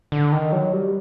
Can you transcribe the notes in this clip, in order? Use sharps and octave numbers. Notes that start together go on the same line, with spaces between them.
D3
D#3
F#3
G3